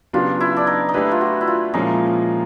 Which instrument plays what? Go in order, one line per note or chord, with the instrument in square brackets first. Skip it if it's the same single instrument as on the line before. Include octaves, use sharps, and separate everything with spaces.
[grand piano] C#3 F#3 B3 D4 G4 [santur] F4
[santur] E4
D4
D#4
D#4
[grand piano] A3 D4 G4 B4 [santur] E4
[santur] F4
F#4
E4
F4
[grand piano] A#2 F3 G#3 C#4 E4 [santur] D#4